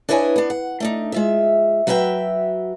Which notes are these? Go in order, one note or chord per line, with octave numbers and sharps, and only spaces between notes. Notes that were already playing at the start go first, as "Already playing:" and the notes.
D4 E4 B4 C#5 D#5 G#5
B3 D4
F#5
A3 D4 D#4
G#3 F4 E5
F#3 F#4 B4 E5 G5